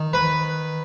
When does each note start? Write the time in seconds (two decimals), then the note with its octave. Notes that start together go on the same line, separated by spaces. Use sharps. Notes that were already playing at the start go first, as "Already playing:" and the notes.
Already playing: D#3
0.13 B4